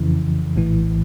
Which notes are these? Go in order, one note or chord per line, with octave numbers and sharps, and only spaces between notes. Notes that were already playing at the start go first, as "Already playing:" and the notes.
Already playing: F2 C#3 E3
A#1 A2 E3